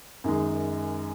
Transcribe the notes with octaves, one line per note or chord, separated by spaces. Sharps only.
F#2 D#3 G#3